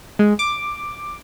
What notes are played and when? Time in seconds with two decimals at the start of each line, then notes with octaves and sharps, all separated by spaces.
0.19 G#3
0.39 D6